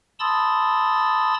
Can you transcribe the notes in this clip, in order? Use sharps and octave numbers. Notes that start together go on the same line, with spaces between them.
A5 B5 C6 D#6 E6 A6